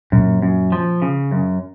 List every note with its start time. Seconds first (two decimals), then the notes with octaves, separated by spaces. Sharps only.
0.12 F#2 A#2
0.42 F#2
0.72 F3
1.02 C#3
1.31 F#2